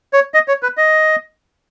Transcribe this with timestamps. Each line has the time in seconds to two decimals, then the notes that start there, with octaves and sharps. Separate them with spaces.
0.13 C#5
0.34 D#5
0.48 C#5
0.63 B4
0.77 D#5